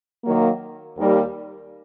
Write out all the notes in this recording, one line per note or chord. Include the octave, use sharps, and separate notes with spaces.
D#3 F#3 A#3
D#2 D#3 G3 A#3